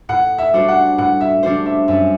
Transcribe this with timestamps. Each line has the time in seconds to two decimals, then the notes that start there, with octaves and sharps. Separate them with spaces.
0.09 A2 F#5
0.38 E5
0.53 G3 D4 F#4 C5
0.68 F#5
0.98 A2 F#5
1.21 E5
1.43 G3 D4 F#4 C5
1.66 E5
1.88 F#2 E5